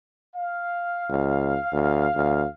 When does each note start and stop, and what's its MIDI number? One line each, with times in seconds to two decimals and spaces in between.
0.35 2.54 77
1.10 1.56 37
1.72 2.07 38
2.15 2.45 38